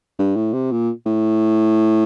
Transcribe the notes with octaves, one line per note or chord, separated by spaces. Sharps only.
G2
A2
C3
A#2
A2